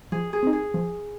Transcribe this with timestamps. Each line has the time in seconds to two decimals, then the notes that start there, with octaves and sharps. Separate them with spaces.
0.12 F3 G#4
0.33 G#4
0.43 C4 D#4
0.53 G#4
0.74 F3